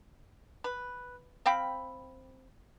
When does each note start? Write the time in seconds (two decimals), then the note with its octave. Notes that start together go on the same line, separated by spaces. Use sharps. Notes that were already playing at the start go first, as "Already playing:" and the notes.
0.64 B4
1.46 C4 F5 G5 B5